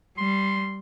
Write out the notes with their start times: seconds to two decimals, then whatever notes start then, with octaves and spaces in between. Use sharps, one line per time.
0.18 G3 C6